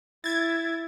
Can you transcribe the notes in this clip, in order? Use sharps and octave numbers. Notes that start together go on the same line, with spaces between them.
E4 G#6 A6